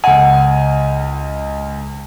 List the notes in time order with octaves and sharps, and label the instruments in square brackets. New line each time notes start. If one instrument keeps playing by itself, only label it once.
[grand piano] C#2 G#5 [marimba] F#5